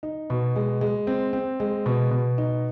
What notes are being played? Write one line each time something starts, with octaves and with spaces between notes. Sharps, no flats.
D#4
B2
G#3
G#3
C4
C4
G#3
B2
B2
D#4